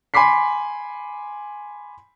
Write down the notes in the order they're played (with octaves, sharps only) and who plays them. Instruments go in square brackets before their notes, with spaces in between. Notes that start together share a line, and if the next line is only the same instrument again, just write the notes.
[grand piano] G#5 B5 C6 D6 B6 C7